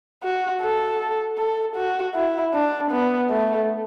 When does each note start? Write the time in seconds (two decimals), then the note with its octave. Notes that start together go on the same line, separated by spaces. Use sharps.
0.24 F#4
0.62 A4
1.38 A4
1.76 F#4
2.15 E4
2.54 D4
2.91 B3
3.30 A3